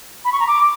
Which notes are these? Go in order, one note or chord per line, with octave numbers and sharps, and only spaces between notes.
B5
C#6
A#5
D6